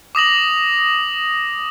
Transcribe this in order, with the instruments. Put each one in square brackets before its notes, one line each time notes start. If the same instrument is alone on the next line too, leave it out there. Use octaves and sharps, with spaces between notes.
[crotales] D6 D#6 A#6 F#7